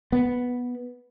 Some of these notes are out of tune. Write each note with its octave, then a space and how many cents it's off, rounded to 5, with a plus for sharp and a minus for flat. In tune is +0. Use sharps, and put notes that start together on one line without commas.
B3 -5